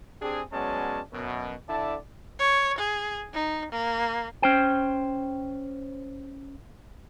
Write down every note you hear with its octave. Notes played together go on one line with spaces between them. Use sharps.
C4 D4 G4 G#4
F#3 G#3 B3 C#4 D5 A5
F#2 B2
D3 E4 D5 E5 A5
C#5
G#4
D#4
A#3
C#4 C5 G5